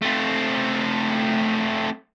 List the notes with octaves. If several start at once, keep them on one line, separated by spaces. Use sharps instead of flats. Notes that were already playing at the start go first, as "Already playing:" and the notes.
A3 C4